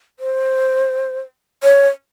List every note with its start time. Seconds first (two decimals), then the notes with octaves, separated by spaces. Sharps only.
0.20 C5
1.63 C#5